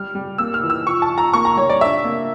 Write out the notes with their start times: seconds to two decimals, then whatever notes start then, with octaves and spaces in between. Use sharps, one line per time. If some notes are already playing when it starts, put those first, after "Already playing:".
Already playing: G3 F6
0.15 G3
0.38 A#3 E6
0.54 F6
0.63 E3
0.70 E6
0.86 F3 C#6
1.02 A5
1.10 F3
1.18 A#5
1.33 A#3 C#6
1.45 A#5
1.57 G3 C#5
1.69 D5
1.81 D4 E5
2.05 A#3